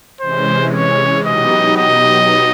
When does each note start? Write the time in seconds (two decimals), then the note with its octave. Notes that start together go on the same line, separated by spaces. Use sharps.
0.21 C3 E3 G#3 C#4 C5
0.74 C#5
1.25 B2 F#3 B3 D#4 G4 D#5
1.77 D#5